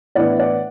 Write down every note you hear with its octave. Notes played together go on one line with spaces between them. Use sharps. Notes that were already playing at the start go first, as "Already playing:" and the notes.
A2 E3 B3 D4 D5 F#5
D5 F#5